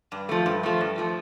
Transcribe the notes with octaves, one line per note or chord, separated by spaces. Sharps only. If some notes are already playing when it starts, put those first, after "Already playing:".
G2
F3 A3
G2
F3 A3
G2
F3 A3